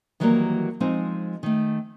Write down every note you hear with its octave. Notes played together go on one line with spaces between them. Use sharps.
D#3 E3 F#3 G3 A3 A#3
F3 G#3 C4 D#4
D#3 A3